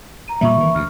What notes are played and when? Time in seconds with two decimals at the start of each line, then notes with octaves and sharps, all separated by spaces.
0.28 A#5 D#7
0.41 A#2 G3 E5 B5 C#6
0.56 D#3 E3
0.75 D2 F6